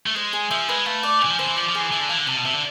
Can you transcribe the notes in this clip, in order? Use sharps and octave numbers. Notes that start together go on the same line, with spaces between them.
A3
G#3 C5
G#4
F3 E5
G#3 B4
A3 F5
D5
E3 G#5
F3
D3 C5
E3
F3 D5
F3
G#4
E3
E3 A5
D3
E3 F5
D3
C3 A5
B2
C3 E5
D3